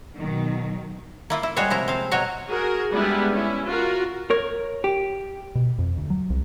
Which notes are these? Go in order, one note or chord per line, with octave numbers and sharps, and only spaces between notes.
B2 D#3 F#3
A#3 E4 F4
E4
G3 G#3 F#4 G#4 C5 C#5
C3 F3 E4 A#5
C4 F5
B2 F#3 F#4 C#5 A#5
F#4 G#4 A#4
G3 G#3 B3 D4 E4 G4
C#4 E4
F4 F#4 A#4
A#4 C#5
G4
B2
F2
D2
F#3
C2